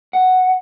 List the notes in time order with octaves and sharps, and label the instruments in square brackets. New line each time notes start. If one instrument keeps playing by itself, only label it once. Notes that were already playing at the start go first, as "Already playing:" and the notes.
[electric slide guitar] F#5